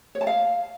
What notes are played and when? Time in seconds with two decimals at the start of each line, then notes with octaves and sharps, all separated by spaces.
0.15 C#5
0.21 A5
0.27 F5